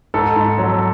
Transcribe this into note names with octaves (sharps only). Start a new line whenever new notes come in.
G#2 A4
G#2
F#3